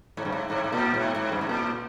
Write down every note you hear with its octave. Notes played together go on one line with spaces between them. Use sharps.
G#2
G2
G#2
G#2
G#2
A#2
G#2
G#2
G2
G#2
A#2